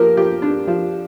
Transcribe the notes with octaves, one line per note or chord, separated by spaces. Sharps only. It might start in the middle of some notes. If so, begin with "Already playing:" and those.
Already playing: F3 A#3 G4 A#4
F3 G4
D4
F3